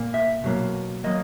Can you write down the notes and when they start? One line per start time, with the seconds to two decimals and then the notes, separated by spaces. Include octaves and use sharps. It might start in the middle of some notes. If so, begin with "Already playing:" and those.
Already playing: A#2 A#3
0.14 E5
0.44 B2 F#3 A#3
1.04 F#3 A#3 D#5